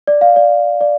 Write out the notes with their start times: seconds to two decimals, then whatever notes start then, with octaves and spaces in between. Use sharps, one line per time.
0.07 D5
0.21 F5
0.36 D5
0.81 D5